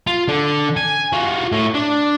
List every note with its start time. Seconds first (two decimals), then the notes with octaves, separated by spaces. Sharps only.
0.07 F4
0.28 D3
0.77 G#5
1.13 F4 F#4
1.52 A2
1.74 D4